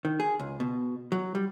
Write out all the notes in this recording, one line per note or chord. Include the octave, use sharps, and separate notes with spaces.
D#3
G#4
C#2
B2
F#3
G3